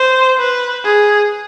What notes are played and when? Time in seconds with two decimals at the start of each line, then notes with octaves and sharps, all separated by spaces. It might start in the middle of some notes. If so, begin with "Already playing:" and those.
Already playing: C5
0.39 B4
0.85 G#4